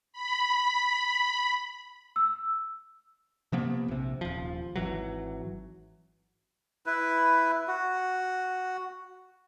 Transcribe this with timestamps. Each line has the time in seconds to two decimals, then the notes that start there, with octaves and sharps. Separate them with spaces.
0.13 B5
2.16 E6
3.52 C3 F3 A#3 B3
3.88 A#1 C3
4.21 D#1 F3
4.76 G#1 E3 F#3
6.86 E4 B4
7.68 F#4